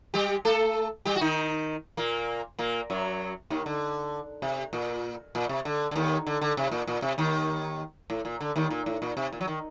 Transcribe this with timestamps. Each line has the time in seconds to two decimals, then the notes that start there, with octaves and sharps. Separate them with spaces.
0.14 G3 G4
0.45 A3 A4
1.05 G3 G4
1.16 F#4
1.21 D#3 D#4
1.97 A#2 A#3
2.59 A#2 A#3
2.90 F#2 F#3
3.50 D#2 D#3
3.66 D3
4.42 C3
4.73 A#2
5.35 A#2
5.49 C3
5.65 D3
5.91 D3
5.96 D#2 D#3
6.27 D3
6.41 D3
6.57 C3
6.72 A#2
6.87 A#2
7.02 C3
7.18 D#2 D#3
8.10 A2
8.25 A#2
8.41 D3
8.56 D#2 D#3
8.71 A#2
8.86 A2
9.02 A#2
9.17 C3
9.33 A#2
9.41 F#3
9.48 D#3